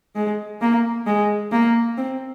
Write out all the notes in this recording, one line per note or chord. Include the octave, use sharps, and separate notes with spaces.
G#3
A#3
G#3
A#3
C4